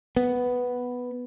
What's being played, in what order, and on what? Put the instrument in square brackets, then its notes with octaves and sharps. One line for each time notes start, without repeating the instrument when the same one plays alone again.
[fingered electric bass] B3